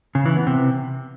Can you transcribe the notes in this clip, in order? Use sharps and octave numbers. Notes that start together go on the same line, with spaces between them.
C#3
E3
B3
C3